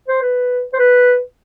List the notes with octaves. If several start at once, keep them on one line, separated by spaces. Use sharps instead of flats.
C5
B4
C5
B4